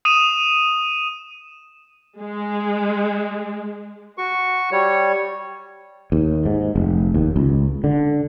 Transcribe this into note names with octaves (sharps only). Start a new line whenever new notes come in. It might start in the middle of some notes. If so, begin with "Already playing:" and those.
D#6 D#7 E7
G#3
F#4 C#6
G3 C#5
D#2
G#2
F1
D#2
C#2
D3